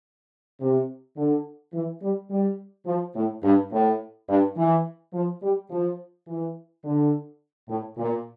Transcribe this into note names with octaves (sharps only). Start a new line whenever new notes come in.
C3
D3
E3
G3
G3
F3
A2
G2
A2
G2
E3
F3
G3
F3
E3
D3
A2
A#2